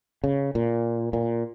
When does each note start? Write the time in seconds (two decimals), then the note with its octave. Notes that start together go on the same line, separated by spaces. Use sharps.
0.24 C#3
0.55 A#2
1.13 A#2